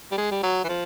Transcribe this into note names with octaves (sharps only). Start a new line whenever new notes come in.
G3
G#3
G3
F#3
E3
F3